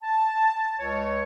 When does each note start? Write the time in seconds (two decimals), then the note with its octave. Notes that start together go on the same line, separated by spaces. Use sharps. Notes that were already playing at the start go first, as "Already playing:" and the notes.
0.03 A5
0.78 C#2 C#5